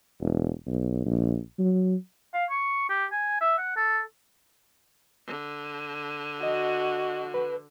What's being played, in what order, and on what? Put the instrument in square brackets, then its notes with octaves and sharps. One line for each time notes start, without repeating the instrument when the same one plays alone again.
[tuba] E1
B1
A#1
F#3
[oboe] F5
C#6
G4
G#5
E5
F#5
A4
[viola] D3
[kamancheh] F#4 [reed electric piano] D#5
[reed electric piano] B4